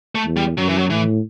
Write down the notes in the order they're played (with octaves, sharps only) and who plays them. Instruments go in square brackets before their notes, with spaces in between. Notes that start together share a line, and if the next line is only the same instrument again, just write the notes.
[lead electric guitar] A3
[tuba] E2
[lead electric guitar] G3
[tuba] F#2 [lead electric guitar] F#3
[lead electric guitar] E3
F#3
[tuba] A2 [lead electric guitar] E3